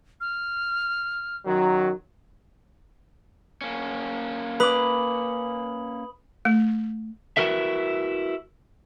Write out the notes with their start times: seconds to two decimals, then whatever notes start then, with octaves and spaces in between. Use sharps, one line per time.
0.21 F6
1.45 F#2 D#3 F#3
3.61 A#3 C#4
4.60 B4 B5 D6 D#6 F#7
6.45 A3
7.37 E4 F#4 A#4 B4 E5